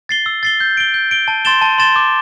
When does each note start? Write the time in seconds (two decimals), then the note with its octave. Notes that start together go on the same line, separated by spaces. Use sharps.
0.09 A6 C7 G7
0.26 E6
0.43 A6 C7 G7
0.60 G6
0.77 D7 G7
0.94 G6
1.11 D7 G7
1.28 A5
1.45 C6 A6 E7 G7
1.62 A5
1.78 C6 A6 E7 G7
1.96 D6